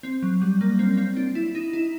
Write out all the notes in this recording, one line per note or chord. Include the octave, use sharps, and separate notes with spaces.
C4
F#3
G3
A#3
C4
C4
D4
E4
D#4
E4